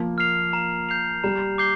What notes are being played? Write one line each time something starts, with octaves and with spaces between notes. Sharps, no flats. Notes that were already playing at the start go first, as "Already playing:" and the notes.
Already playing: F3 A#3
F6 C7 F7
A#5
G6 C7 F7
G3 A#5
D6 G6 C7 G7